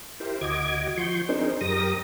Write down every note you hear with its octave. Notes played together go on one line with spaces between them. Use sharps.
E4 G4 A#4 C5
D2 F#4 D#5 D6 G#6
F3 C6 C#6 G6
C4 D4 D#4 G#4 A#4 C5
F#2 G4 A#4 D#6 A#6